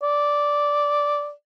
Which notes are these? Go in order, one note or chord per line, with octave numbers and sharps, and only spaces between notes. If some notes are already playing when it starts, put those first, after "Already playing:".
D5